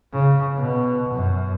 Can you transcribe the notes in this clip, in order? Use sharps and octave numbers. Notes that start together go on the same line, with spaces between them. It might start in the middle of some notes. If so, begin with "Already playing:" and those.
C#3
B2
F#2